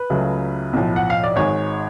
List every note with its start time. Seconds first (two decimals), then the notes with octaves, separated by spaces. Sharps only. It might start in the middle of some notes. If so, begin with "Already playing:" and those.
Already playing: B4
0.10 C#2 C#3 F#3 A3
0.73 B1 A2 F3
0.96 F#5
1.10 F5
1.23 D5
1.36 G#1 G#2 G#3 C#5